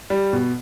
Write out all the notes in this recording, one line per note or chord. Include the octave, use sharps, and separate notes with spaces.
G3
B2